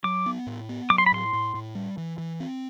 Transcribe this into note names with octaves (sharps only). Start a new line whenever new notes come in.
F#3 D6
B3
A2
B3
F#3 D6
C6
B5
A2 C6
A2
A2
G3
E3
E3
C4